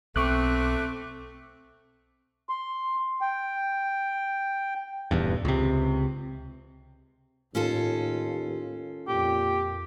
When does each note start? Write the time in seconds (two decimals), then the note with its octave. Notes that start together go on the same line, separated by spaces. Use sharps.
0.16 B1 A3 C4 C#6 D6 F#6
2.49 C6
3.21 G5
5.11 D#1 E2 G2
5.45 C#2 C3
7.55 D#2 A2 C#4 F4 A4
9.08 F2 A#2 G4